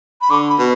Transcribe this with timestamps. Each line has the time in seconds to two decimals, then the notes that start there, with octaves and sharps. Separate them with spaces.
0.21 B5
0.30 D3 D6
0.50 B5
0.59 B2